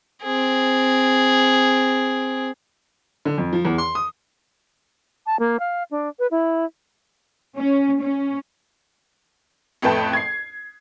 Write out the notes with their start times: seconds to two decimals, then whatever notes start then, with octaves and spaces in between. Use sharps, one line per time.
0.22 C4 G#4
3.25 D3
3.38 F2
3.53 F3
3.65 E2
3.78 C6
3.95 D#6
5.26 A5
5.39 A#3
5.59 F5
5.91 D4
6.19 B4
6.31 E4
7.57 C#4
8.01 C#4
9.82 A1 F2 A3 B4 G5 A5
10.13 G#6 C7